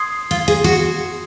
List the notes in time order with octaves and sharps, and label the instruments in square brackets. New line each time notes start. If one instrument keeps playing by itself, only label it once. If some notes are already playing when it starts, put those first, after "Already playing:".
Already playing: [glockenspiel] C6 D#6 G#6 C7
[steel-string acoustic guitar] F4
G#4
F#4